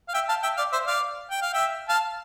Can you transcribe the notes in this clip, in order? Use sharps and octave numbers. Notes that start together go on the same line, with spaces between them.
F5
E5 G5
F5 A5
E5 G5
D5 F5
C5 E5
D5 F5
G5
F5
E5 G5
F5 A5